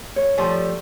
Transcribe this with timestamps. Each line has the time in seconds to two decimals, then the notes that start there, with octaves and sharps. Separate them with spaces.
0.16 C#5
0.38 F3 G3 A3